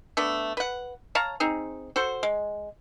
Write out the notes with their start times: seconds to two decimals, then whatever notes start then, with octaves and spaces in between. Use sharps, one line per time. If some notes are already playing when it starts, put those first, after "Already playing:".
0.17 A3 B3 D4
0.57 B4 F#5
1.15 C#5 F5 A5 A#5
1.40 C4 D#4 G#4
1.96 F#4 A4 C5
2.23 G#3